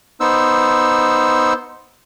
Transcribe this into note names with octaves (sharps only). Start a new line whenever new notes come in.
B3 D#4 C5 E6